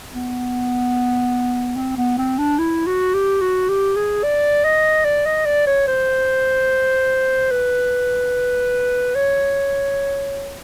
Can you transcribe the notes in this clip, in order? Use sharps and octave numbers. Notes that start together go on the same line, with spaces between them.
B3
C4
B3
C4
D4
E4
F#4
G4
F#4
G4
G#4
D5
D#5
D5
D#5
D5
C#5
C5
B4
C#5